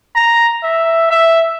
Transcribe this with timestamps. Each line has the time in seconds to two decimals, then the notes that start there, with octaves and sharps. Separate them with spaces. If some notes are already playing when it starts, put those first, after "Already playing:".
0.15 A#5
0.63 E5
1.10 E5